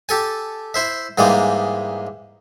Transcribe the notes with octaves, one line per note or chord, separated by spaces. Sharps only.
G4 A4 G#5
E4 C5 E5
G#2 E3 G3 G#3 A#3